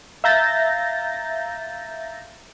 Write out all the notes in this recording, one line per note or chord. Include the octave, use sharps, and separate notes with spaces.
E5 F5 A#5 G6 A6 A#6